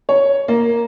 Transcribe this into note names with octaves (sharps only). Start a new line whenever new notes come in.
C#5
A#3